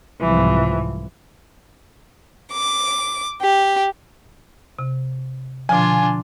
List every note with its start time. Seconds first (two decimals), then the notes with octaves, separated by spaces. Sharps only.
0.20 C2 G#2 E3 F3
2.52 D6
3.41 G4
4.79 C3
5.69 B2 D3 F3 D4 F4 G#5